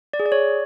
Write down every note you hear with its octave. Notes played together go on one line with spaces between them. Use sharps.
D5
G#4
D5
C#5